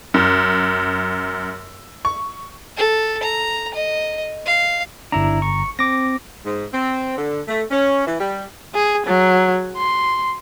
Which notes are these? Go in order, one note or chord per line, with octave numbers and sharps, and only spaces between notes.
F#2
C#6
A4
A#5
D#5
F5
G1 D4 E4 A#5
C#6
C4 D6 A#6
G#2
C4
D3
A3
C#4
E3
G3
G#4
F#3
C6